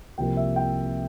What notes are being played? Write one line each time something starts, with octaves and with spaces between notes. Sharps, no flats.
C2 C3 F3 A#3 G5
E5
G5